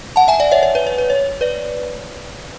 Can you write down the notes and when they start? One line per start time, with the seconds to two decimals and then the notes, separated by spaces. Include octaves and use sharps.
0.16 F#5 A5
0.28 E5 G#5
0.40 D5 F#5
0.51 C#5 E5
0.63 C#5
0.75 B4
0.87 C#5
0.98 B4
1.10 C#5
1.41 B4 D5